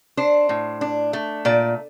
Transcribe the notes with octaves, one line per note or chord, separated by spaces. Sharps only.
D4 C5
A2
D4
A3
A#2 D5